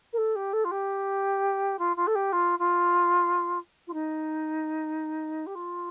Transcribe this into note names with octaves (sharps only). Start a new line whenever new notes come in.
A#4
A4
G4
A4
F4
G4
F4
F4
A4
G4
F4
F4
F4
D#4
G4
F4